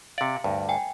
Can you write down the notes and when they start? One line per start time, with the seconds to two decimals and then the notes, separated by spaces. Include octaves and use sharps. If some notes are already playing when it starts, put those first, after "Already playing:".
0.18 C3 D5 F5 C#7
0.44 D2 G2
0.69 G5 G#5